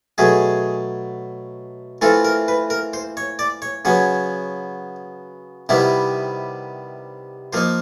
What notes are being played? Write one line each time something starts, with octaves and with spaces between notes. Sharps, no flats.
B2 F#3 A3 G#4
E3 A3 C4 F4 A4
A#4
B4
A#4
C5
C#5
D5
C#5
C#3 F#3 B3 C#5
C3 D#3 G3 B3 E4
F3 A#3 D#4 C5